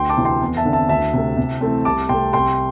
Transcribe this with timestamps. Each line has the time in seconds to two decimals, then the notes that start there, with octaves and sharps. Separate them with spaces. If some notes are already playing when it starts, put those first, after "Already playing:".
Already playing: D2 G5 C6
0.09 A5 D6
0.17 C3 E3 C4
0.25 G5 C6
0.41 E2
0.57 E5 A5
0.65 D3 C4
0.73 E5 A5
0.89 D2 E5 A5
1.13 C3 A3
1.37 C3
1.61 E3 A3 C4
1.85 C2 A5 D6
2.09 C3 A3 G5 C6
2.33 C2 G5 C6